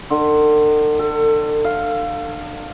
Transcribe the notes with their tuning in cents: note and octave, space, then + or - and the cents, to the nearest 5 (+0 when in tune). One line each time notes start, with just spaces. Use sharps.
D3 +40
A4 +30
F5 +0